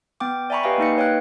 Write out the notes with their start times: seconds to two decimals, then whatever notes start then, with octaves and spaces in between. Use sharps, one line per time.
0.20 B3 G5 D6
0.50 D5 E5 G#5 A#5 B5 C#6
0.63 G4 B4 D#5 F5 G5 G#5
0.78 A#3 D#4 D#5 C#7
0.97 B4 C#5 F5 G5 F#6